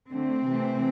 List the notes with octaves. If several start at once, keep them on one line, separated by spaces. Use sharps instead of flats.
D3 A3 C4
C3 E3 A3